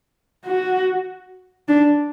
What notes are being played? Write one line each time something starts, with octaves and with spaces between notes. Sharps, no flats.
F#4
D4